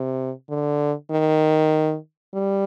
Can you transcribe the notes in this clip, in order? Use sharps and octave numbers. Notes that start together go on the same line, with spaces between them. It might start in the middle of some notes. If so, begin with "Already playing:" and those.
Already playing: C3
D3
D#3
G3